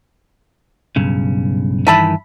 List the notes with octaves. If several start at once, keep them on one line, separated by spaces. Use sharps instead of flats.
B1 G2 C#3
G2 D#3 E3 E5 A5 B5